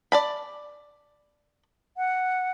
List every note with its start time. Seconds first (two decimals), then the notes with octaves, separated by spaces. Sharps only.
0.12 D5 A5 B5
1.97 F#5